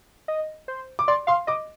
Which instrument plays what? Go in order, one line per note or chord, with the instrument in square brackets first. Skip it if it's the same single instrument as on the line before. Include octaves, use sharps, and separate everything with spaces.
[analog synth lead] D#5
C5
[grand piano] D6
[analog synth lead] D5 [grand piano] C6
[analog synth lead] F5 [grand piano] C6
[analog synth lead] D#5 [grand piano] D6